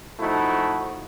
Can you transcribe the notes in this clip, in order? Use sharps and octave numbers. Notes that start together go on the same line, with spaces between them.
F3 A3 D#4 E4 F#4